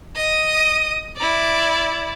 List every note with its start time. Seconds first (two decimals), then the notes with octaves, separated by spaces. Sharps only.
0.16 D#5 D#6
1.17 E4 D5